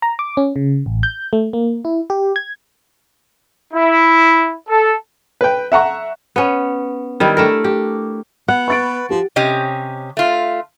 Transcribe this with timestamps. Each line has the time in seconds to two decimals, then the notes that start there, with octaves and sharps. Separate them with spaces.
0.02 A#5
0.19 D6
0.37 C#4
0.56 C#3
0.86 A1
1.03 G6
1.33 A3
1.53 A#3
1.85 E4
2.10 G4
2.36 G#6
3.73 E4
4.69 A4
5.41 B4 G5
5.72 E5 F#5 A#5 C#6
6.36 B3 C#4
7.20 D#3 G3 E4
7.37 A3 D4 A#4
7.64 G4
8.48 B3 F#5
8.68 B4 C#6 A6 D7
9.10 F3 G4
9.36 C3 C#4 G4 D#5
10.17 A3 F4